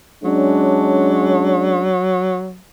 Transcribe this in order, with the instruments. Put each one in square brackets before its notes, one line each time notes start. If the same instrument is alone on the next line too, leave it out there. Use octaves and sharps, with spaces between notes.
[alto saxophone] F#3 [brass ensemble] G#3 C#4 D4